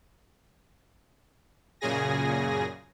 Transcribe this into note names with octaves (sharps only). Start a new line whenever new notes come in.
F#2 A#2 C#3 G#4 G#5 A#6